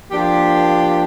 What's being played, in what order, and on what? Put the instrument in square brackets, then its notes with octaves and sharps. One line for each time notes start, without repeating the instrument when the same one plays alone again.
[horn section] F3 A#3 D4 G4